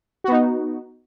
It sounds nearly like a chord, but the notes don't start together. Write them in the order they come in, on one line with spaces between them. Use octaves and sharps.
F#4 B3 D#4